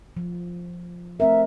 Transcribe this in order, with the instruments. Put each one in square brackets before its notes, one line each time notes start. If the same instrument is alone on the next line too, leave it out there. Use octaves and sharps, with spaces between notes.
[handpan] F3
[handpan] A3 C4 A#4 [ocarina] E5